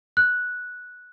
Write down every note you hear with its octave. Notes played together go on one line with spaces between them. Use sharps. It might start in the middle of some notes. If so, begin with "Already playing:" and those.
F#6